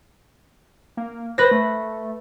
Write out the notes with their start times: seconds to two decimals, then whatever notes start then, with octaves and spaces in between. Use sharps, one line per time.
0.97 A#3
1.38 B4 C5 A#6
1.51 A3